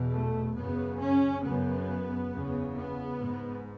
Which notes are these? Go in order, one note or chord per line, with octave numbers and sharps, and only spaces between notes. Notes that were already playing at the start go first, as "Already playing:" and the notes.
Already playing: E2 B2
A3
F#2 C#3 B3
C#4
F#2 C#3 B3
E2 C#3
B3
G#2